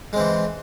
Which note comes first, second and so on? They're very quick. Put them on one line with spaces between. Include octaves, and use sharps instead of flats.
G#3 C4 E3